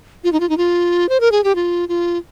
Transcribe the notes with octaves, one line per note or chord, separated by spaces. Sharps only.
F4
D#4
F4
D#4
F4
C5
A#4
G#4
G4
F4
F4